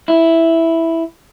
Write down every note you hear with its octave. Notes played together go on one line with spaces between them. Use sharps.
E4